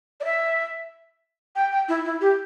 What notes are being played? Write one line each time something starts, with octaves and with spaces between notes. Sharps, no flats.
D5
E5
G5
G5
E4
E4
G4